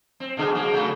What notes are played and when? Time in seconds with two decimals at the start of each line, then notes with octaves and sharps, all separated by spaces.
0.20 C4
0.37 B2 D3 G#4
0.55 F#3 A#3
0.72 C#3 F#3 A3